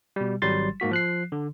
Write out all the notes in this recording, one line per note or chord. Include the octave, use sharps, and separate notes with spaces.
B2 G3
G#1 F#3 G3 C6 A6
G#2 A#3 F#4 B6
F3 F#6 C7
D3